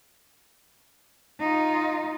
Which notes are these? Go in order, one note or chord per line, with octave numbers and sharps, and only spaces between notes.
D#4 F4